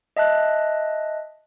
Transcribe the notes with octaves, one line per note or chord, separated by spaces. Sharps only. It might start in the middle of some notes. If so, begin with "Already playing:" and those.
D#5 E5 A5 F#6